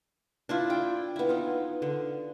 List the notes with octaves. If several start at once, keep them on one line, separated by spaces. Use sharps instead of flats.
D4 E4 F4
G5
B3 E4
D#4 F4
D3